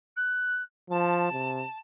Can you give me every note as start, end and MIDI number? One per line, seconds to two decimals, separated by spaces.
0.16 0.61 90
0.90 1.32 53
0.90 1.78 81
1.33 1.63 48